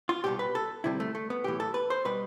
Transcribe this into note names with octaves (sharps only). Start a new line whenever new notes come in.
F4
C2 B2 G3 G4
B4
A4
D2 C3 G3 E4
A3
A3
B3
B1 A2 E3 G4
A4
B4
C5
B2 G3 B4